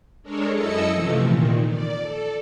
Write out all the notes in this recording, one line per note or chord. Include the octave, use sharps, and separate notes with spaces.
G#3 D4 A4 A#4 C#5
F#2 E4 A4 D#5 E6 C#7
C3 E3 F3 A3
A#2 D#3
D5
A4